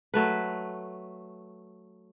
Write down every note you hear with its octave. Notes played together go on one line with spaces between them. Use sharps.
F#3 A3 B4